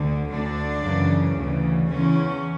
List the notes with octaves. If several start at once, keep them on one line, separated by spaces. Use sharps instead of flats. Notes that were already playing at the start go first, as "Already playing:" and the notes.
Already playing: D2 D3
D2 D3 D4
F#2 C#3 E3
D2 C#3 E3
E2 C#3 E3 C#4